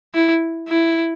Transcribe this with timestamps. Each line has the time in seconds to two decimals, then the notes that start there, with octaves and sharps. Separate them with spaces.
0.14 E4
0.69 E4